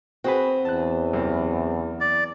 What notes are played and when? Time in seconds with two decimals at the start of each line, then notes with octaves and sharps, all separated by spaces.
0.24 C4 F#4 G#4 B4
0.65 E2 A5 F#6
1.13 F#2 C3
2.01 D5